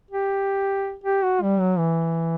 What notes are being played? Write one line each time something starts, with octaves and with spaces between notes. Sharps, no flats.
G4
G4
F#4
G3
F#3
E3